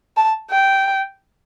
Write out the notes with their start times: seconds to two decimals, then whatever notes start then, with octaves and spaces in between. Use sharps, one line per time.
0.17 A5
0.51 G5